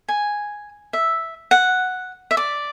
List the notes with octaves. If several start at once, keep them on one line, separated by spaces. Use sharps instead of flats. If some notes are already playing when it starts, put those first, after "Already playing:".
G#5
E5
F#5
E5
D5